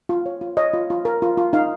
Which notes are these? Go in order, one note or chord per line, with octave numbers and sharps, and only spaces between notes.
F4
C#5
F4
C#5 D#5
F4
F4
A#4
F4
F4
D#4 F5